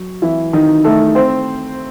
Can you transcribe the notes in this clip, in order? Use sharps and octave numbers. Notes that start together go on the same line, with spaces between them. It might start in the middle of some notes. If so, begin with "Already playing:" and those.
Already playing: F#3
E3 E4
D#3 D#4
A3 A4
C4 C5